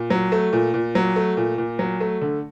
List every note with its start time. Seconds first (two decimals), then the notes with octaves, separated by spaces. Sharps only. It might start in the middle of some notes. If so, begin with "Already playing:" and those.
Already playing: A#2
0.10 F#3
0.32 A3
0.53 A#2
0.74 A#2
0.95 F#3
1.16 A3
1.37 A#2
1.58 A#2
1.79 F#3
2.00 A3
2.21 D3